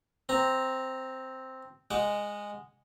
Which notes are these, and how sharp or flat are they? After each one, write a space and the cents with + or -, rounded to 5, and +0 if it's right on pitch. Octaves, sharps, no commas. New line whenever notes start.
C4 +0 A#5 -5
G#3 -10 F#5 +0 D6 -40